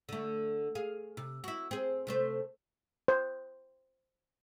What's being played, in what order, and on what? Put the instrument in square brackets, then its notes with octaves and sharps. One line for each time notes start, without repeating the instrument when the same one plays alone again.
[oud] D3 A3
G#4 F5
C3
E4 F#4
C4 G#4
C3 A3 C5
[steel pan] C5